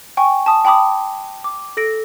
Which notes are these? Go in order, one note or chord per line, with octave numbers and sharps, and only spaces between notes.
G5 G#5 C#6
A5 D#6
G5 A5 B5 D6 D#6
D6
A4 A#6 D7